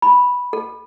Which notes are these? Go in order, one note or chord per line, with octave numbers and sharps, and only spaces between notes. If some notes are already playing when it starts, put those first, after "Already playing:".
B5
A4